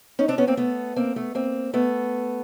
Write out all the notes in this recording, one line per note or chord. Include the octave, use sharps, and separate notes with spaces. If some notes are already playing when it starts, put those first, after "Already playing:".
C#4 D#4
C4 D4
B3 C#4
A#3 C4
A3 B3
A#3 C4
A3 B3
A#3 C4
A3 B3